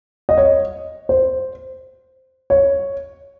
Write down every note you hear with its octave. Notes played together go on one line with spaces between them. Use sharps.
D#5
C#5
C5
C#5